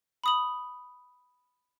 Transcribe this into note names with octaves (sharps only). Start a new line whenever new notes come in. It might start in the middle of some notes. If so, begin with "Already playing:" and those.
B5 D#6 F#7